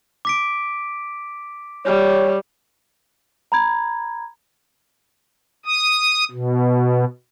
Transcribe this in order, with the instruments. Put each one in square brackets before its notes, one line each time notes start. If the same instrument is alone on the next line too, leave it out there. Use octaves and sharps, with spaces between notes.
[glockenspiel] D6 B6 D7
[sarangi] G3 [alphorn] C#5
[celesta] A#5 B5 G#6
[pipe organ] D#6
B2